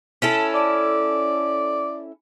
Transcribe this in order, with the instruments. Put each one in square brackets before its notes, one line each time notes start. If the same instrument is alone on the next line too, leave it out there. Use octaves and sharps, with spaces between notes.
[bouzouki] C#4 E4 A4
[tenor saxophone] D5